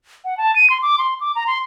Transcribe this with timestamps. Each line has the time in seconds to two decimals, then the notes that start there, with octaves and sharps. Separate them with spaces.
0.25 F#5
0.37 A5
0.56 D#7
0.70 C6
0.82 D6
0.98 C6
1.20 D6
1.35 A#5
1.47 C6